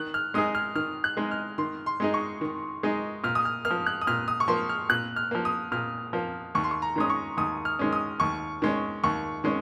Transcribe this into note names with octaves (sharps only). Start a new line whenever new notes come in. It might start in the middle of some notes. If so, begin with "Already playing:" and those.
Already playing: D#3 F#6
F6
G#3 D#4 G#4 D#6
F6
D#3 F6
F#6
G#3 D#4 G#4
F6
D#3 C6
C6
G#3 D#4 G#4
C#6
D#3
G#3 D#4 G#4
A#2 F6
D#6
F6
A#3 F6
F3
F#6
D#6
A#2 F6
D#6
C#6
F3 A#3 C6
F6
A#2 F#6
F6
F3 A#3
D#6
A#2 F6
F3 A#3
D#2 C#6
C6
C#6
A#5
D#3 G#3 C#4 D#6
C#6
D#2 D#6
F6
D#3 G#3 C#4
D#6
D#2 C#6
D#3 G#3 C#4
D#2 C#6
D#3 G#3 C#4